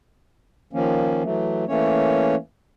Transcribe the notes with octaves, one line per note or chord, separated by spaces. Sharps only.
D#3 F3 A#3 C#4
E3 F#3 A3
E3 A3 A#3 C#4 C#5